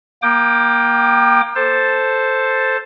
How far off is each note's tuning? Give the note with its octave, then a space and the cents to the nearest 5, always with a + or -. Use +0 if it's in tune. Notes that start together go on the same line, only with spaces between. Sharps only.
A#3 +20 G5 +0 D6 +35
A4 +0 C5 +0 A5 +0